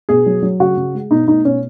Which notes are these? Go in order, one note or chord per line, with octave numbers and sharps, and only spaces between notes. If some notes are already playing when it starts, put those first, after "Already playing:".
B2 G#4
F#3
F#3
C#3 F#4
C#3
G#3
B2 D#4
A3 D#4
B2 C#4